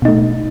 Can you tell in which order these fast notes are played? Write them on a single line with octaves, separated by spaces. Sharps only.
B2 D#4 A3